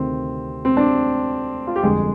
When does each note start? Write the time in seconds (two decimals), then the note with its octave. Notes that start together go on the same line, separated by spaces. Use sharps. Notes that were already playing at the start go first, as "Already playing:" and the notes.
Already playing: D2 C3 D#3 C4
0.65 C4
0.77 D4
1.67 F4
1.76 G4
1.83 G1 F2 D3 G#3 G#4